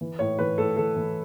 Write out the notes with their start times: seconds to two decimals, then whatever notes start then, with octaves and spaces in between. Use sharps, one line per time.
0.01 E3
0.19 A2 C#5
0.39 E3 B4
0.58 A2 A4
0.77 E3 A4
0.96 E3